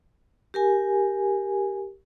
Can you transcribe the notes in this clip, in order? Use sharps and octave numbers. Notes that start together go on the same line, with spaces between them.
G4 A#4 G#5